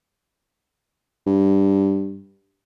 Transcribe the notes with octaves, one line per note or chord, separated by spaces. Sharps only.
G2